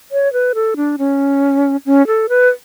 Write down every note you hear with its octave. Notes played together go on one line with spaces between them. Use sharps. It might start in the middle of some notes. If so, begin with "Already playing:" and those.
C#5
B4
A4
D4
C#4
C#4
A4
B4